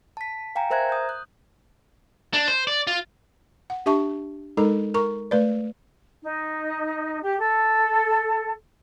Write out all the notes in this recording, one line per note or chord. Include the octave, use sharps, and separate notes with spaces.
A5 B6
F5 G5 G#5 A#5
A#4 C5 E5 A#5 F#6 G#6
D#6 G6
F#6
D4
C5
D5
F4
F#5
D4 G4 E5 A5 C#6
G#3 D#4 A4 A#4 A#5
A#4 A#5 C#6
A3 B4 D5
D#4
G4
A4